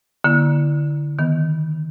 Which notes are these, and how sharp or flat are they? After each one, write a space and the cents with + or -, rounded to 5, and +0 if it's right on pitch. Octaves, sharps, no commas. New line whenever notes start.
D3 +0 A#3 +30 E4 +0
D#3 +15 B3 -5